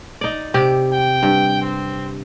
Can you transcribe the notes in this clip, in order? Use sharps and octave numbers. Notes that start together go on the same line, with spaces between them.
D#4 D5
C3 G4
G5
G2
C4